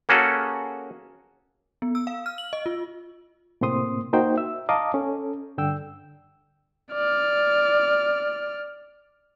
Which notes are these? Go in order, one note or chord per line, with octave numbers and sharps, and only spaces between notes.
A#3 C#4 F#4 G#4 A4
B3
E6
F5
F6
F#7
D#5
F4
A2 C3 A#3 C4 C6 D#6
A#3 D#4 F#4 C5 G5
E5 E6
D#5 F5 A5 A#5 D6 D#6
C#4 A4
G2 D3 G5 E6
D5 F6